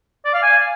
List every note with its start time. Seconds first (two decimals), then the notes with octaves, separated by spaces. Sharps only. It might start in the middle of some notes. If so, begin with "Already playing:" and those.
0.25 D5
0.34 F5
0.43 G#5